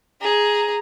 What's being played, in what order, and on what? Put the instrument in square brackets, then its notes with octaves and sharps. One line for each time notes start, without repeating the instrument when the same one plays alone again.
[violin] G#4 A#5